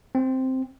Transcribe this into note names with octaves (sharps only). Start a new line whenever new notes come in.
C4